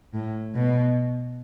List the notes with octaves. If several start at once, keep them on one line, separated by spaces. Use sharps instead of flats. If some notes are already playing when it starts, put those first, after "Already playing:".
A2
B2